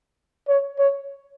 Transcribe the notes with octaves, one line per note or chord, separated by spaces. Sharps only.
C#5
C#5